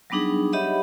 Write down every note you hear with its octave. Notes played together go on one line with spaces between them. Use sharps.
F#3 G3 B3 D4 D#4 G#4
G4 C#5 D#5 E5 F#5 B5